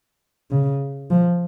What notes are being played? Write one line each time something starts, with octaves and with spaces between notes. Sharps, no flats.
C#3
F3